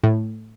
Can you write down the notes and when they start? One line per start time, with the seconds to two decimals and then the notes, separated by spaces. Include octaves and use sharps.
0.04 A2